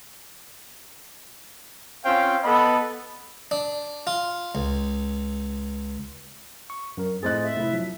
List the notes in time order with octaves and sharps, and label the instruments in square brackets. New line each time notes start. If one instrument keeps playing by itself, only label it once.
[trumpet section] C4 C#4 F4 C5 F5 G5
B3 A4 D#5 B5
[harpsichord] D4
F4
C#2
[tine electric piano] C#6
F#2 A#4
[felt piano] F2 A2 F#6 [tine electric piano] G#4 C5 D#5 [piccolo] A6
[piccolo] E5
[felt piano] F1 E4 [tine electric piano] A3
[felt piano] F3 [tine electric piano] F#3